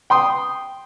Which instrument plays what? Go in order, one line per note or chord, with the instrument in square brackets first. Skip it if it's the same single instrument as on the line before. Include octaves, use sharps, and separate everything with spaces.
[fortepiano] G5 C6 D#6